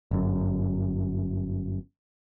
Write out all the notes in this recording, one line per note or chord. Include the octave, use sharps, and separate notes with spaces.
G1 F#2